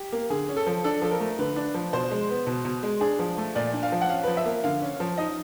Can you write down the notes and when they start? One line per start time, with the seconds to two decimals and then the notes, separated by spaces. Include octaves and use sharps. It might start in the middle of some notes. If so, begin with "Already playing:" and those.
Already playing: G4
0.12 A#3
0.30 D3 G#4
0.48 C#4
0.56 A4
0.66 F3
0.84 D4 A4
1.02 F3 A4
1.11 A#4
1.20 A3
1.39 D3 B4
1.56 D4
1.74 F3
1.93 B2 C5
2.11 G#3
2.29 B3
2.47 B2
2.65 B2
2.83 G#3
3.01 D4 G#4
3.19 F3
3.38 A3
3.55 A#2 D5
3.73 D4
3.83 F5
3.92 F3
4.01 F#5
4.09 C#4 F5
4.24 F3 B4
4.37 E5
4.46 A#3
4.64 D3 F5
4.82 C#4
5.00 F3
5.18 D#4 D#5